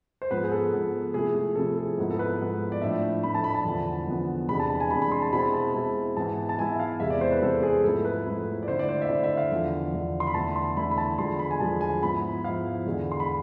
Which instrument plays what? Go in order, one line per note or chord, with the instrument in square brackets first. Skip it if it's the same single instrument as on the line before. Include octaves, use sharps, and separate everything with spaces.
[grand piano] C5
G#2 F3 B3 B4
G#4
A4
G#2 F3 B3
C3 F3 A3 E4 G#4
G#4
C3 F3 A3 E4 A4
G#4
G#2 F3 B3 E4
A4
B4
G#2 F3 B3 E4
D5
A2 F3 A3 D4 E5
A2 F3 A3 D4 B5
A5
B5
A5
E2 D3 F3 B3
E2 D3 F3 B3
E2 C3 G#3 D4 B5
A5
A5
G#5
E2 C3 G#3 D4 B5
B5
C6
A5
B2 G#3 C4 E4 B5
A5
B2 G#3 C4 E4
G#2 E3 B3 E4 A5
A5
G#2 E3 B3 E4 G#5
E5
F5
E2 C3 G#3 B3 E4 E5
D5
C5
B4
E2 C3 G#3 B3 E4 A4
G#4
G#2 F3 A3 E4 A4
B4
G#2 F3 A3 E4
D5
D3 A3 E4 C5
D5
C5
E5
D3 A3 E4 D5
E5
F5
E2 D3 F3
E2 D3 F3
C6
B5
E2 D3 A3 E4 A5
C6
E2 D3 A3 E4 B5
B5
A5
E2 D3 F3 G#3 C6
B5
G#5
E2 D3 F3 G#3 A5
G#5
G#2 F3 B3 E4 B5
G#2 F3 B3 E4 F5
E2 D3 G#3
C6
B5